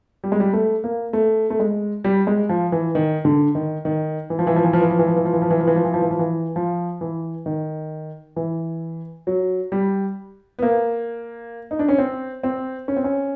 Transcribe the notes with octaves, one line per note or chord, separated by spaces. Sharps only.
G3
G#3
G3
A3
A#3
A3
A3
G#3
G3
G#3
F3
E3
D#3
D3
D#3
D#3
E3
F3
E3
F3
E3
F3
E3
F3
E3
F3
E3
F3
E3
F3
E3
F3
E3
F3
E3
F3
E3
F3
E3
F3
E3
D#3
E3
F#3
G3
B3
A#3
D#4
D4
C#4
C4
C4
C#4
C4
C#4